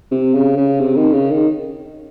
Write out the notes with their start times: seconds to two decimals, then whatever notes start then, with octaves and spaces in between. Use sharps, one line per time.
0.11 C3
0.34 C#3
0.57 C#3
0.80 C3
0.96 D#3
1.13 C#3
1.31 D#3